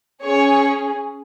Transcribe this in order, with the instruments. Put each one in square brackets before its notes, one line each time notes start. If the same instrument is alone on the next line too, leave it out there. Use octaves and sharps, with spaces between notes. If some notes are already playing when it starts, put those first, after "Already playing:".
[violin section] C#4 G#4 C#5